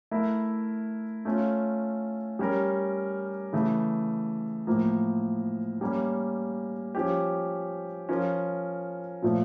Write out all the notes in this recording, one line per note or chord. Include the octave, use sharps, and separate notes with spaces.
A3 E4 A#4
A3 C#4 F4
G3 C#4 G4 A#4
C#3 E3 A3
A2 F3 A#3
G3 A#3 C#4
F3 C#4 G4
F3 C#4 F4 A#4
A#2 F3 A3